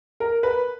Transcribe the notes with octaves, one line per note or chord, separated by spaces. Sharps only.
A#4
B4